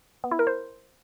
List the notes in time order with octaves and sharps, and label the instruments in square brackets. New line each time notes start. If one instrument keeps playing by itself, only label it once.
[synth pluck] B3
E4
A#4
C5